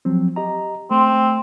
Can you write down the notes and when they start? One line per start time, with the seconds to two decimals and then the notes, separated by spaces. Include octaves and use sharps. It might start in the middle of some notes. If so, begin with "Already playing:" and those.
0.05 F3 F#3 C4
0.36 G4 D#5 A#5
0.91 A3 C4